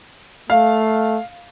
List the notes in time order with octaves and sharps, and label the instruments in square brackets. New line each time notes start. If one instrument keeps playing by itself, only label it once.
[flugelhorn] A3 [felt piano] F5